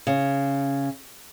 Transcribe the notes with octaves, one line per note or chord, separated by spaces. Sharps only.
C#3